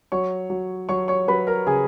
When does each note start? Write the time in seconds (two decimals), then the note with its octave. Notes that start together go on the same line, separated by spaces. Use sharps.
0.12 F#3 C#5 C#6
0.50 F#3
0.89 F#3 C#5 C#6
1.08 C#5 C#6
1.28 F#3 B4 B5
1.47 A#4 A#5
1.67 C#3 G#4 G#5